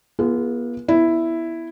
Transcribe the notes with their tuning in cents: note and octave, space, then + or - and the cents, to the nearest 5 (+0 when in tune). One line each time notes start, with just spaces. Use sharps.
B3 -40 F4 -35 G#4 +0
B3 +0 E4 +0